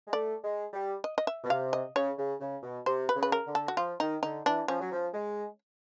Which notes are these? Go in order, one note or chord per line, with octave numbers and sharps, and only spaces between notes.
G#3
A3 D5
G#3
G3
D#5
D#5
E5
B2
C3 F5
D#5
C#3 C#5
C#3
C#3
B2
C3 C5
B4
C#3
B4
A#4
D3
A4
F#4
F3 F4
D#3 D#4
D3 D#4
E3 D4
F3 C#4
F#3
F3
G#3